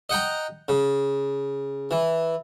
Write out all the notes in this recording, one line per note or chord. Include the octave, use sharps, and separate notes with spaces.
D#5 F#5 G5 A#5
C#3
E3